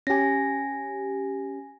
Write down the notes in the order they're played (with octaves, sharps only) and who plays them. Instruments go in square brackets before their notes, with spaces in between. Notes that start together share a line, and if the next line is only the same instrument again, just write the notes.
[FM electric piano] C#4 G4 [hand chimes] G#5 A#6